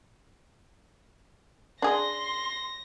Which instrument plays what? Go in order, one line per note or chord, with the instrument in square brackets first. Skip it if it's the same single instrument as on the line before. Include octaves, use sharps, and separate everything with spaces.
[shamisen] D4 G#4 [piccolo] C6 [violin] A#6